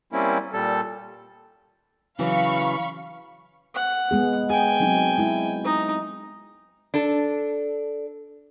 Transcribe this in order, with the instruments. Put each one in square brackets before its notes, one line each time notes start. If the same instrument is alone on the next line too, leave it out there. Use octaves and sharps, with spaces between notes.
[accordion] G3 A#3 C4 C#4 E4
A#2 G3 A4
[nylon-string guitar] C#3 E3 F#3 [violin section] F5 B5 C#6
[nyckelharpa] F#5
[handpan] G#3 B3 G#4
[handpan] G#4 [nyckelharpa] G5 G#5
[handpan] F#3 C4 D#4
G#3 E4
[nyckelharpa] D#4
[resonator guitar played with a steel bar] D4 A4